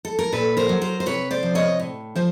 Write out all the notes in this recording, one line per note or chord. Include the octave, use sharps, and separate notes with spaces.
A4
A#4
A#2 A4 B4
A#4 C5
F#3
A#4 C5
C5
C3 B4 C#5
C5 D5
F3
C#5 D#5
A2
F3 C5